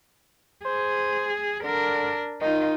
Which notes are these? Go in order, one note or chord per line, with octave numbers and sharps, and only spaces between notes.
G#4 C5
D3 D4 A#4
D#3 D#4 F4